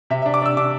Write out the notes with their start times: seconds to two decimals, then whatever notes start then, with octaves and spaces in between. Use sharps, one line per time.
0.10 C3 E5
0.22 E5
0.26 D4
0.34 D6
0.42 D4 E6
0.57 D4 D6